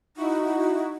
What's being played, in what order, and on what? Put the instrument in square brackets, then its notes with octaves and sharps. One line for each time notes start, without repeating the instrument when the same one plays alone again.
[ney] D#4 [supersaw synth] E4 F#4